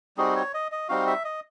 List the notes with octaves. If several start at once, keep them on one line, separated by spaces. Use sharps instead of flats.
G3 C4 D#4 F#4 G#4
C#5
D#5
D#5
G3 C4 D#4 F#4 F5
E5
D#5